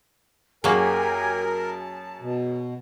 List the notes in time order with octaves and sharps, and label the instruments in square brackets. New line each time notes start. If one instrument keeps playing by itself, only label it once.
[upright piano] F#2 G#4 [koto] F#3 A#3 [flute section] G4 G#5 A#5 [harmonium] A#4
[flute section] A5
[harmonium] B2